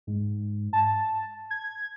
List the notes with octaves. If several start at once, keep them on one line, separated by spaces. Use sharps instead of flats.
G#2
A5
G#6